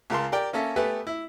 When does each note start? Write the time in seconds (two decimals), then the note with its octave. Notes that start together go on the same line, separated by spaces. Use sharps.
0.10 C#2 C#3 A#4 A5 C6
0.32 G4 A#4 D5 G5
0.53 A#3 C#4 A4 E5
0.76 A3 B3 G4 A4 B4 G#5
1.07 E4